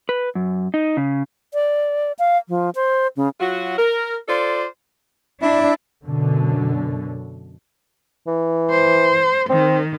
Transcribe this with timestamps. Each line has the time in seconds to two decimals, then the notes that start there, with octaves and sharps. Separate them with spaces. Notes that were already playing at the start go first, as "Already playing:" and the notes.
0.09 B4
0.35 F#2
0.74 D#4
0.97 C#3
1.54 D5
2.19 F5
2.48 F3
2.75 C5
3.17 C#3
3.40 F#3 F4 F#4
3.77 A#4
4.28 F4 A4 C5 D5
5.42 D4 E4 E5
6.04 F#2 B2 D3
8.27 E3
8.70 C5
9.50 D#3 C4